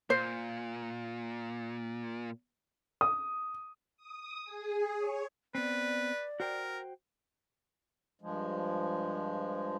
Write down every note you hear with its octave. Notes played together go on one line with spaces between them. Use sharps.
A#2 C5
D#6
D#6
G#4
C#5
B3 C4 B4 D5
F#4 A#4 C5 G5
G2 F3 G#3